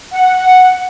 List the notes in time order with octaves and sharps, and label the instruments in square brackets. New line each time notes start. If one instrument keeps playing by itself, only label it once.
[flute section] F#5